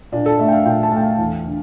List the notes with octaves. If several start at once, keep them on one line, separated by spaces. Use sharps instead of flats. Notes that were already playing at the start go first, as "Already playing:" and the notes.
A#2 D4
A4
A3 E5
G5
F5
A#2 G5
A5
A3 G5
F5
E2
D3